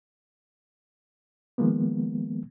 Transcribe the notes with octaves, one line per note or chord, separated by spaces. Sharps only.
D#3 F3 G#3 A#3 B3